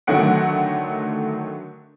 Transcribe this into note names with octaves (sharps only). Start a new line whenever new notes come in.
D3 D#3 F#3 A3 F#5 D7